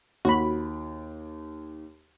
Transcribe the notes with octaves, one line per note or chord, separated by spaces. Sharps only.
D#2 F#4 B5